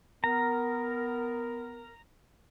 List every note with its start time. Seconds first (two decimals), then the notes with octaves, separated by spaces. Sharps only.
0.24 B3 A#4 A#5